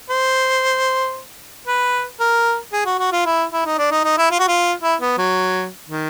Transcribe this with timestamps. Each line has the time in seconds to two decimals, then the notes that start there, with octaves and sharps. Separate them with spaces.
0.10 C5
1.67 B4
2.20 A#4
2.73 G#4
2.85 F#4
2.99 F#4
3.12 F4
3.26 E4
3.53 E4
3.65 D#4
3.78 D4
3.91 D#4
4.04 D#4
4.18 E4
4.31 F4
4.39 F#4
4.47 F4
4.83 E4
5.01 B3
5.18 F#3
5.88 D#3